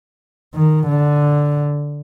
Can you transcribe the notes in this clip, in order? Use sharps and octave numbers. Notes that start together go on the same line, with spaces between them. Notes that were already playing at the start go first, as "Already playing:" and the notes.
D#3
D3